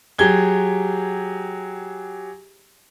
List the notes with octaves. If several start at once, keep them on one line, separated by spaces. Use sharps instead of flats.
F#3 G4 G#4 G#6 G7